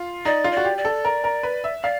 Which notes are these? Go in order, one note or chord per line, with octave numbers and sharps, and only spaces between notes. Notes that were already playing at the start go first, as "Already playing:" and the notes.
Already playing: F4
D#4 D5
F4
D5
F#4
G4
D5
A4
A#4
A#4
B4
E5
D5 F5